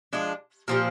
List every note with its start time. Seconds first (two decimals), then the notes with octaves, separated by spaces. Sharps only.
0.13 F3 G#3 D4
0.68 A#2 F3 C4 G4